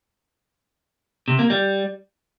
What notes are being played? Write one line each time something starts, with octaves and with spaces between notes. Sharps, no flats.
C3
A#3
G3